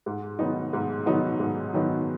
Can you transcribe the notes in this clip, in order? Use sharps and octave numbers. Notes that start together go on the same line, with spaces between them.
G#2
D#3 F#3 B3 D#4
G#2
D#3 F#3 B3 D#4
G#2
D#3 F#3 B3 D#4